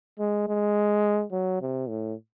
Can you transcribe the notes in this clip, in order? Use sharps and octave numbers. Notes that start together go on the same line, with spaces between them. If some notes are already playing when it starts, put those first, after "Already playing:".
G#3
G#3
F#3
C3
A2